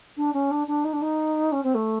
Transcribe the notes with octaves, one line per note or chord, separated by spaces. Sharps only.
D4
C#4
D4
D4
D#4
D4
D#4
C#4
C4
A3